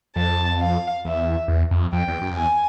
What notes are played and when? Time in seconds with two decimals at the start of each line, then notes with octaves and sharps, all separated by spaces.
0.16 F2 A5
0.60 F5
1.05 E2 E5
1.48 E2
1.71 F2
1.92 F2 G5
2.08 E2
2.21 F#2
2.31 F2
2.37 E2 G#5